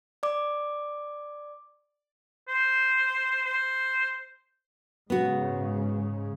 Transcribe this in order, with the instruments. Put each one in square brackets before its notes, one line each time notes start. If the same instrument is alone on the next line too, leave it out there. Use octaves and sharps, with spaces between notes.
[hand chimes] D5 D6
[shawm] C5
C5
[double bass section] G#2 C#3 [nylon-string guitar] B3 F#4